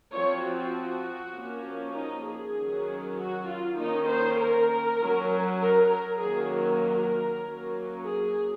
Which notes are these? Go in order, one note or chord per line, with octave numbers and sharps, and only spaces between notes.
F3 C4 C#5
F#4
F3 A#3 C#4
D#4
G#4
D#3 F#3 C#4
F#4
F4
D#3 A#3 C#4 D#4
C5
A#4
F#3 C#4
A#4
A#4
D#3 F#3 A#3 C#4 G#4
A#4
F#3 A#3 C#4
G#4